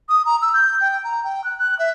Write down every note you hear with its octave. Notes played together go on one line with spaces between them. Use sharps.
D#6
A#5
E6
G6
G5
A#5
G5
F#6
F#6
E5